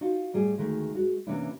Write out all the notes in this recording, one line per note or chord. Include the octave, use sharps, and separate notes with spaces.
D#4 F4 F#4
A2 G3 G#4
D2 D#3 G#3 A3
G#3 F#4
C3 E3 A#3 C#4 D4 E4